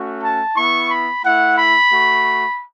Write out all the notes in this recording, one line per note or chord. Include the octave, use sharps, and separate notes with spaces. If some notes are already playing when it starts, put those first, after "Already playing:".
Already playing: A3 C#4 F#4
A5
B3 E4 C#6
B5
A3 E4 F#5
B5
A3 F#4